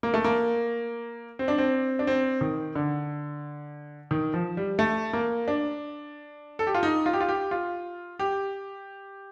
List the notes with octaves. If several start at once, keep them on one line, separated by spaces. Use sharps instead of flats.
A#3
A3
A#3
C4
D4
C4
D4
C4
D#3
D3
D#3
F3
G3
A3
A#3
D4
A4
G4
F4
D#4
F4
G4
F4
G4
F4
G4